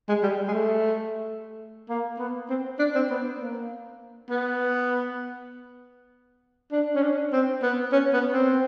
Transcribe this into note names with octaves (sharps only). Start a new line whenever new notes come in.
G#3
G3
G#3
A3
A#3
B3
C4
D4
C4
B3
A#3
B3
D4
C#4
D4
C4
B3
C#4
B3
C4